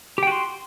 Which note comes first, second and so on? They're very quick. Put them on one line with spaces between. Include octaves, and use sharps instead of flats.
G4 G5 F#4 C6